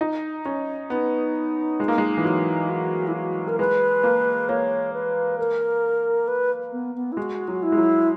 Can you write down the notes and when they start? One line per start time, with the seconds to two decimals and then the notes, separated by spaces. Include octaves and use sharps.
0.01 D#4
0.45 C#4
0.90 B3 D#4
1.80 G#3
1.88 A#3
1.98 G#3
2.17 E3
2.25 F#3
2.69 F#4
3.07 E4
3.14 F#4
3.48 A#4
3.59 G#3 B4
4.03 A#3
4.49 A#3 C#5
4.93 B4
5.38 A#4
6.28 B4
6.72 B3
6.95 B3
7.12 E4
7.17 G#3 F#4
7.48 F#3 F#4
7.63 E4
7.72 G#3
7.77 F#3